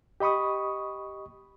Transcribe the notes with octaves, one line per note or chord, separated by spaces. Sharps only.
G4 D#5 B5 C#6 D#6